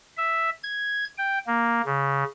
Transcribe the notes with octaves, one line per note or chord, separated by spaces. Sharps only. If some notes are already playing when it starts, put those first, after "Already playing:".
E5
G#6
G5
A#3
C#3